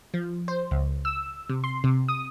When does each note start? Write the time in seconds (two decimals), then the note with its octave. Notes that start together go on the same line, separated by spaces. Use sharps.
0.14 F3
0.48 C5
0.71 C#2
1.05 E6
1.49 C3
1.64 C6
1.84 C3
2.08 D#6